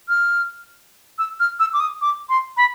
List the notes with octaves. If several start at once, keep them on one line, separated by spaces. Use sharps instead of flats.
F6
E6
F6
E6
D6
D#6
D6
C6
B5